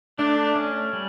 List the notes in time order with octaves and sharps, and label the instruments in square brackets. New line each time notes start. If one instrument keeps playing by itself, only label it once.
[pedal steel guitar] A3 [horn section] D4
[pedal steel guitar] C#4
G3